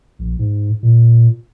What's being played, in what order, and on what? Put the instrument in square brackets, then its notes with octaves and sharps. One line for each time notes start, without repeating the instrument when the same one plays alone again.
[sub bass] A#1
G#2
A#2